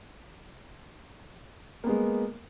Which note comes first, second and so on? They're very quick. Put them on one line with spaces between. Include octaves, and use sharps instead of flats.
A#3 B3 G#3